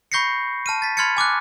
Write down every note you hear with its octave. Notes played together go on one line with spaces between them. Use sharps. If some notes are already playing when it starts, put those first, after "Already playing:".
B5 C#6 G6 A#6 C7 C#7
A5 F6 D#7
A6 B6
B5 C6 F6 G#6 A6 C#7
G#5 D6 F6 F#6